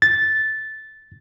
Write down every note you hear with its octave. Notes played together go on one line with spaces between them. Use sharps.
A6